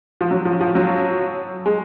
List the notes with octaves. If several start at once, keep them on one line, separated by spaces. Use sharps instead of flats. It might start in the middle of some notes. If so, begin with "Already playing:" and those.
F3
F#3
F3
F3
F#3
G#3